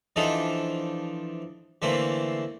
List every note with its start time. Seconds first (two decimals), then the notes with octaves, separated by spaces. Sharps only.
0.16 E3 F3 D4 D#4 A4
1.82 D3 E3 A3 A#3 C4